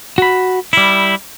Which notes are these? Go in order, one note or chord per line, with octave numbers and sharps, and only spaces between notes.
F#4 B5
G3 E4